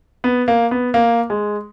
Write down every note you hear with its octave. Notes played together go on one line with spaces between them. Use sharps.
B3
A#3
B3
A#3
G#3